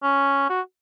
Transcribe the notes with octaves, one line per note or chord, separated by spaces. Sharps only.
C#4
F#4